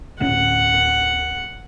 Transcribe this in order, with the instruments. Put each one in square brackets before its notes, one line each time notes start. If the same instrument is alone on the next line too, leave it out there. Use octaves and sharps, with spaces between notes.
[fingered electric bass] D1 A2 C#4 [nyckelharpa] F#5